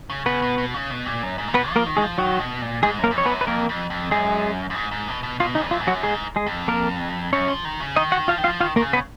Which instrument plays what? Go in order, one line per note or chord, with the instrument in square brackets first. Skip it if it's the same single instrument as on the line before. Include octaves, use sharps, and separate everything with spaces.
[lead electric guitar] C#3
[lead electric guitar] C#3 [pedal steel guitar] B3 B4
[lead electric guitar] B2
B2
C#3
B2
A#2
F#2
G#2
A#2
[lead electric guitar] B2 [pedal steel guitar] B3 B4
[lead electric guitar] F3
[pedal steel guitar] A#3 A#4
[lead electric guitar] D#3
[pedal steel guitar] G#3 G#4
[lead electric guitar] F3
[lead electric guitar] D#3 [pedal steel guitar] F#3 F#4
[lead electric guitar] B2
A#2
[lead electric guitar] G#2 [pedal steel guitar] G#3 G#4
[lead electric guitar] F#2
[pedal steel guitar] A#3 A#4
[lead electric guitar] F#2
[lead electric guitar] F2 [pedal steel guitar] C#5
[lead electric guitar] G#2 [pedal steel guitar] B3 B4
[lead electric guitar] F#2
[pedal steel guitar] B4
[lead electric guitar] F2 [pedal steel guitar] A#3 A#4
[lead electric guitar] F2
F2
[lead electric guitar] F#2 [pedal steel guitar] G#3 G#4
[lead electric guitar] F#2
G#2
G#2
B2
B2
[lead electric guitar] B2 [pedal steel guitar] F4
[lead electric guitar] C#3 [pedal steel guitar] D#4
[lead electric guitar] F2
[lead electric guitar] F#2 [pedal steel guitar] F4
[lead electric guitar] G#2
[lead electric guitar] F#2 [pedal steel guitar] F#3 F#4
[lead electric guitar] G#2 [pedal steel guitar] G#3 G#4
[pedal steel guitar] G#3 G#4
[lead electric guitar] F2
[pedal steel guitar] A#3 A#4
[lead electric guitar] F#2 [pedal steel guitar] C#4 C#5
[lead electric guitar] F3
D#3
C#3
[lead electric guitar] D#3 [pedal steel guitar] D#4 D#5
[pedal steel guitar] F#4 F#5
[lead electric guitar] F3 [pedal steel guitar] F4 F5
[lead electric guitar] D#3
[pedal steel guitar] F4 F5
[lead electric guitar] F3
[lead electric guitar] D#3 [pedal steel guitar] F4 F5
[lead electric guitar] D#3 [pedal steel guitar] A#3 A#4
[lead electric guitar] C#3
[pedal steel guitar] B3 B4